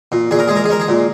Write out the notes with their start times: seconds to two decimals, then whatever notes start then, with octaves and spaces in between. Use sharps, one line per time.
0.12 A#2
0.31 A#2 G#4
0.39 A#4
0.48 G#3 G#4
0.56 A#4
0.64 G#4
0.69 G#3 A#4
0.80 G#4
0.88 A#2